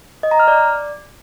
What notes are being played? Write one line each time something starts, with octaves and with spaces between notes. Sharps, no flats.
D#5
A#5
F6
D5